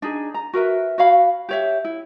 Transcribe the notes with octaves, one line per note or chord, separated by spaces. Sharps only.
D4 D#4 G#4
A#5
F#4 A#4 B4 E5
F#4 C#5 F5 B5
G4 C#5 E5
E4